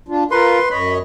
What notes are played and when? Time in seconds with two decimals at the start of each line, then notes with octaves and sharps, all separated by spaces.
0.08 D4 F4
0.31 F4 A#4 B4 C6
0.71 F#2 C#5 D#5 B5